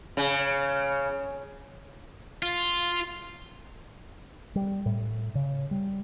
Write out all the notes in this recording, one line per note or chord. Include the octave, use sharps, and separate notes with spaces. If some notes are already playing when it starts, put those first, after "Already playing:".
C#3
F4
G3
A2
C#3
G3